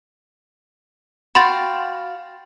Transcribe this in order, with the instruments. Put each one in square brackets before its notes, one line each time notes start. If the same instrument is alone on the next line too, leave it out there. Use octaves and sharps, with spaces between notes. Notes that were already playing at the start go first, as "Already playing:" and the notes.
[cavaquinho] F#4 F5 G5 [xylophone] B5 C6 A6